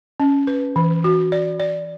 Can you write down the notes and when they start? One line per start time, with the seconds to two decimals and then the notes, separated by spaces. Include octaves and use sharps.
0.20 C#4
0.47 B4
0.76 E3
1.04 F#4
1.32 D5
1.60 D5